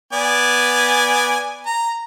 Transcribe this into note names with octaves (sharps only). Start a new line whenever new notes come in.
B3 D5 G#5
A#5